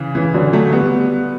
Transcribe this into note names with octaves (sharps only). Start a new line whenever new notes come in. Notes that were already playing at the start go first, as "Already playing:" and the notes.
Already playing: C#3 E3
C#3 E3
D3 F#3
F#3 A3
G3 B3